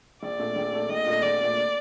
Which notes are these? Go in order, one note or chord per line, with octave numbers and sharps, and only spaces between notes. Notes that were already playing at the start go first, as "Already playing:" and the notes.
A#1 D5
A#2 A3 D4 A4
A#1
A#2 A3 D4 A4
A#1 D#5
A#2 A3 D4 A4
A#1 D5
A#2 A3 D4 A4